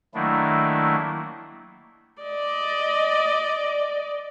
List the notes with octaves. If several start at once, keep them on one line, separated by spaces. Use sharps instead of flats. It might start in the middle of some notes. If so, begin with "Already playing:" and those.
D#3 F#3 A3 A#3 D4 E4
D5 D#5